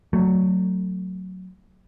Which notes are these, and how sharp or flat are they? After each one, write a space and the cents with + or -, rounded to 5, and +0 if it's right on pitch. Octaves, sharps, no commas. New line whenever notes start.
F#3 +0 A3 +20